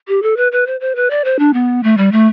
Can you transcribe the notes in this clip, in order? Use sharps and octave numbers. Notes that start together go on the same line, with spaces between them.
G4
A4
B4
B4
C5
C5
B4
D5
C5
D4
B3
A3
G3
A3